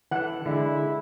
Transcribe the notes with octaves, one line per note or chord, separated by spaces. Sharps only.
E3 A4 F#5
D3 G#3 E4